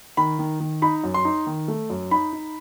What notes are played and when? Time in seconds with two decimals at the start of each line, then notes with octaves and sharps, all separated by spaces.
0.17 D#3 B5
0.39 D#3
0.60 D#3
0.82 D#4 B5
1.04 F#2
1.14 C6
1.25 D#4
1.47 D#3
1.68 A3
1.90 F#2
2.11 D#4 B5
2.33 D#4